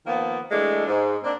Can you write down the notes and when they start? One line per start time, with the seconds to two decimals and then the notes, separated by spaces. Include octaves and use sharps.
0.06 D#3 F3 A#3 B3
0.51 E3 G#3 A3 D4
0.87 G#2
1.23 A#3 C4 D4